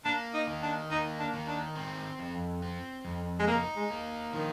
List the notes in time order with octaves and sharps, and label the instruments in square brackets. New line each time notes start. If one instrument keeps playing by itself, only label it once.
[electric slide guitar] A#3 [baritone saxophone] D4
[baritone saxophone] D#4
[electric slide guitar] D#3
[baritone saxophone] D4
[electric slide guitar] A#3 [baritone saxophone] D#4
[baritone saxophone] D4
[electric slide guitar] D#3
[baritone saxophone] D4
[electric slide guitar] C4
F2
C4
F2
[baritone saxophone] G#3
[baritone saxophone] A#3 [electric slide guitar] D#4
[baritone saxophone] G#3
[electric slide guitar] A#3
[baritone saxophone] D#3 [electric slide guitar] F3